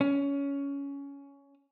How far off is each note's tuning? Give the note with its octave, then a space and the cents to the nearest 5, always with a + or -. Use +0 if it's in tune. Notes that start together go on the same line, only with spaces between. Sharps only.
C#4 +15